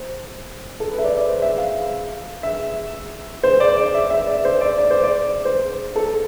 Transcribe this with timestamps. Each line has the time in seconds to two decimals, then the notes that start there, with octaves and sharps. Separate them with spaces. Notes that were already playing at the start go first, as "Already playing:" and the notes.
Already playing: C5
0.80 A4
0.92 B4
0.98 E5
1.04 D5
1.16 D5
1.29 C5
1.42 E5
1.58 F5
2.43 E5
3.43 C5
3.60 D5
3.77 D5
3.95 E5
4.10 E5
4.27 D5
4.45 C5
4.61 D5
4.78 D5
4.91 C5
5.04 D5
5.45 C5
5.96 A4